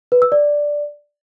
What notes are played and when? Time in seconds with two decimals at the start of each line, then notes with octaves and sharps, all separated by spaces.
0.12 B4
0.22 E6
0.32 D5